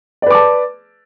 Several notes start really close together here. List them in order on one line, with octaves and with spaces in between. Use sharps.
D5 B4 D6 A5